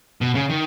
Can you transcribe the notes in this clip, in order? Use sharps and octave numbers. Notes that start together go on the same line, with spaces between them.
B2
C#3
D#3